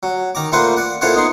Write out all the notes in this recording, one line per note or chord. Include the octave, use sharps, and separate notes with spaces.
F#3
D#3 A#5 D6
A#2 A3 A#3 B4 C5 F#5
D5 F#5
A#2 E4 A4 C5 C#5 F#5
B3 D#4 C6